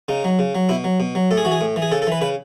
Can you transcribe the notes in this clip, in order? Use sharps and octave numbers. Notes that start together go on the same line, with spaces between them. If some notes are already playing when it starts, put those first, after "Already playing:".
C#3 D#4
F#3
C#3
F#3
B2 E4
F#3
B2
F#3
A2 A4
G#4
E3 F#4
G#4
A2
E3
G#4
C#3 A4
A4
E3 B4
C#3 B4